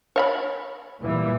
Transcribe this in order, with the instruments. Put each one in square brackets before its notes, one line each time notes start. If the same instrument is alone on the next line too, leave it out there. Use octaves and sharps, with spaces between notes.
[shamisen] C#5 F5 B5
[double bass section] A#2 E3 G3